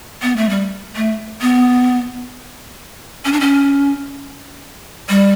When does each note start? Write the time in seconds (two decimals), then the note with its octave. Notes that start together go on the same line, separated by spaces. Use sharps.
0.22 B3
0.37 A3
0.49 G3
0.96 A3
1.41 B3
3.25 C#4
3.33 D4
3.41 C#4
5.09 G3